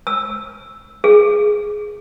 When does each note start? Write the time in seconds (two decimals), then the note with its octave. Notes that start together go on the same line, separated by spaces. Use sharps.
0.07 E6
1.04 G#4